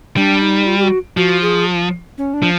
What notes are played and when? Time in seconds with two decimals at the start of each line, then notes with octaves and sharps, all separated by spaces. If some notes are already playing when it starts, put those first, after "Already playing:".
0.17 G3 D4
0.42 D#4
0.67 F4
0.78 G4
0.83 F#4
1.17 F3 F#4
1.42 G#4
2.18 C#4
2.34 D4
2.42 F3